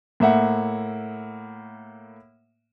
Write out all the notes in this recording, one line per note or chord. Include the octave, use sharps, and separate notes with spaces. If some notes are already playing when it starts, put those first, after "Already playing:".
A2 A#3 E5 F#5